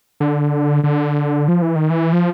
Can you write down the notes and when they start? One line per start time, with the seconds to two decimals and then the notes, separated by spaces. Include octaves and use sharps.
0.20 D3
0.84 D3
1.48 F3
1.62 E3
1.76 D#3
1.90 E3
2.13 F3